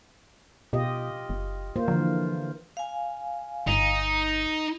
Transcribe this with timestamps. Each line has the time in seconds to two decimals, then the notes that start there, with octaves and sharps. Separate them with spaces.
0.73 B2 F4 G4 D#5
1.30 F#1
1.76 A#3 F4 C5
1.88 D3 E3 F3
2.77 F5 G#5
3.67 G1 D#4